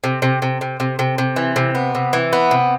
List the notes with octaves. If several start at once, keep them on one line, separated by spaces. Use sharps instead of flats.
C3
C3
C3
C3
C3
C3
C3
E3
C3
B3
C3
E3
B3
C3